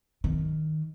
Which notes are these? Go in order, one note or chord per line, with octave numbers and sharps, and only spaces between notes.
D#3